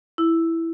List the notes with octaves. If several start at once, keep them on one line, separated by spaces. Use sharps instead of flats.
E4